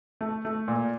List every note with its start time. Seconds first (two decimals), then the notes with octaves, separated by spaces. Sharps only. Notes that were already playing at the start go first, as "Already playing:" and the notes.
0.21 A3
0.45 A3
0.68 A#2